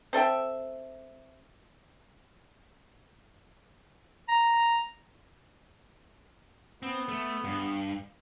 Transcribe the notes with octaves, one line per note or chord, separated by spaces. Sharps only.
C4 A4 E5 G5
A#5
B3 C4
A3
G2